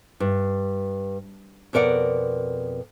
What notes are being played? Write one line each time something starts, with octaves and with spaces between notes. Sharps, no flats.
G2
F2 B2 A#4 D5 F#5